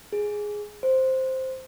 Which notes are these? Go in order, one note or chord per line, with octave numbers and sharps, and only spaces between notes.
G#4
C5